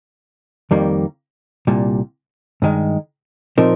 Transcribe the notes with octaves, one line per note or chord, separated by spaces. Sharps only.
F2 D#3 G3 A#3
C2 A#2 G3
G2 D#3 G#3
A#2 F3 C4 D#4 A#4